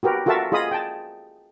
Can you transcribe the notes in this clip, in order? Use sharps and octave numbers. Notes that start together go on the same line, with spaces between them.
F#4 G4 A#4 B4
F4 F#4 A4 A#4 E5 A5
F4 G#4 D#5 B5 D#6
G5 A5